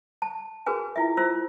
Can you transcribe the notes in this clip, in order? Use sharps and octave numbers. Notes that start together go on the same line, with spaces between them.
A5
F#4 G#4 A#4 B4 G#5
E4 F4 E5
F4 C5 E6